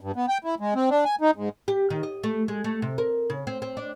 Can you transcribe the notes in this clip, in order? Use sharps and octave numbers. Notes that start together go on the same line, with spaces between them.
G2
B3
G5
E4
G#3
C4
D4
G#5
D#4
G#2
G4
D#3
D#5
A3
G#3
A3
C3
A#4
C#3
C4
C4
D4